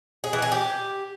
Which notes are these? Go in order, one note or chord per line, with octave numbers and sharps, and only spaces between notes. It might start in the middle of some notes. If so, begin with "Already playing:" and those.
G#4
E3
G#4
G4